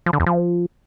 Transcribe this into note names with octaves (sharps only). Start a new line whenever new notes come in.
F3
D3
E2
F3